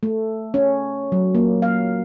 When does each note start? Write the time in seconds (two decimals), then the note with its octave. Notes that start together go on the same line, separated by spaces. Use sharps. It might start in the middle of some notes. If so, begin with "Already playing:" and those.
0.03 A3
0.54 C#4
1.12 F#3
1.35 A#3
1.62 F5